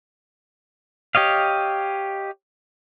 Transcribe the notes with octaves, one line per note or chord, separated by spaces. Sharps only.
G4 C#5 D#5 F5